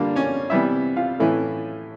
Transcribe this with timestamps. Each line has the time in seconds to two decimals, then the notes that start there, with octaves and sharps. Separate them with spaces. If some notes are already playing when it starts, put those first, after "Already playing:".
Already playing: D3 G3 A#3 D4 F4
0.16 C#4 C#5
0.50 C3 E3 G3 B3 E4 E5
0.97 F4 F5
1.20 A2 E3 A3 C#4 E4